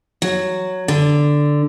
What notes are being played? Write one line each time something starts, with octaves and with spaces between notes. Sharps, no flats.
F#3
D3